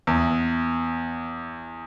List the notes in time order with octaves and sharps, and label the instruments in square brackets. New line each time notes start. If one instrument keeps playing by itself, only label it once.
[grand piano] E2